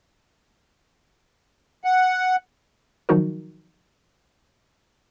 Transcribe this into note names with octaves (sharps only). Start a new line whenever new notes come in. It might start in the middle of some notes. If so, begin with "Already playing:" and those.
F#5
D#3 F3 F#3 D#4 F#4 A#4